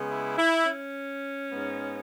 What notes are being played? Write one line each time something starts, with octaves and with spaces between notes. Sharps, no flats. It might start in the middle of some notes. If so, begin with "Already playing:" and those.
Already playing: C#3 G#3 B3
E4
E4
C#4
G#2 G#3 B3